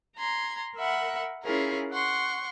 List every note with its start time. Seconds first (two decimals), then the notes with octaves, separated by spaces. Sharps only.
0.16 A#5 C6 G#6
0.77 A#4 E5 F#5 B5
1.43 C#4 E4 F4 G#4 A#4
1.91 F#5 C6 C#6